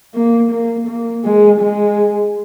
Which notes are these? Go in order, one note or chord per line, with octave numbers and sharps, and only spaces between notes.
A#3
A#3
A#3
G#3
G#3